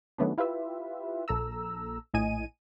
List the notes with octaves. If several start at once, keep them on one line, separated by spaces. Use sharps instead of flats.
D#3 F#3 A3 B3 C#4 D4
E4 F4 G4 B4 E5
A#1 A4 A#5 E6
A#1 A2 D#5 G#5 D#7